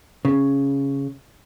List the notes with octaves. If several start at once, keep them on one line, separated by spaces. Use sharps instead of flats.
C#3